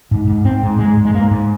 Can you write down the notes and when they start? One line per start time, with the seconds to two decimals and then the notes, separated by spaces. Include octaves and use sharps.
0.11 G#2
0.28 G#2
0.44 G#2 C4
0.63 G#2
0.79 G#2 G#3
0.97 G#2
1.05 G#3
1.14 G#2 A#3
1.31 G#2